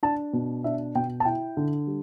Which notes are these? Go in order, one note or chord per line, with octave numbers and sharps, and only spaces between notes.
D4 A5
B2
D4 E5
B2 G5
A5
E4 G5
D3
G3